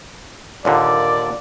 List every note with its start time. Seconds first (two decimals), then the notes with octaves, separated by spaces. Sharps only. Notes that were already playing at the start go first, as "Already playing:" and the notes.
0.65 D#2 A#2 D3 D5